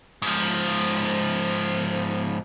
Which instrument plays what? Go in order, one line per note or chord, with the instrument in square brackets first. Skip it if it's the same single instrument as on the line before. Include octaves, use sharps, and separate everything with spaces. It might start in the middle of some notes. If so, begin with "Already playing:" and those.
[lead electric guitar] G#2 F3